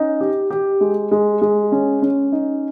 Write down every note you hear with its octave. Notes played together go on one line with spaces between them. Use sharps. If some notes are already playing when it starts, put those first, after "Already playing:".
Already playing: C#4 D#4
G4
G4
G#3
G#3
G#3
C#4
C#4
D#4